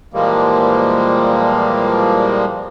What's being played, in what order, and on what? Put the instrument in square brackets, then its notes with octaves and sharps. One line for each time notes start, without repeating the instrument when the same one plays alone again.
[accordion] A#2 E3 F3 G3 G#3 A#3